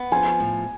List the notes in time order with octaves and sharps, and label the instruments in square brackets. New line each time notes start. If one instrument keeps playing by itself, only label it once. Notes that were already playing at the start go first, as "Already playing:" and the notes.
Already playing: [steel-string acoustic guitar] B3
[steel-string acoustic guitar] F3 [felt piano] G#5
[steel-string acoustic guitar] A2